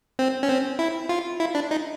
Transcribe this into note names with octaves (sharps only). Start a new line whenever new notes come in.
C4
C#4
C4
E4
F4
E4
D4
D#4